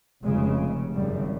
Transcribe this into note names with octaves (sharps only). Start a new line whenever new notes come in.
F1 F2 C#3 G#3
G#1 F#2 C#3 G3